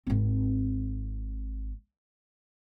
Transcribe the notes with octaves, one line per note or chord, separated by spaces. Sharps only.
G#1 C4